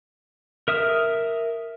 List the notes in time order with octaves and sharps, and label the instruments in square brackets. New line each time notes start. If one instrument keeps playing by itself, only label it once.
[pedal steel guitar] A#4 E5 D#6 F6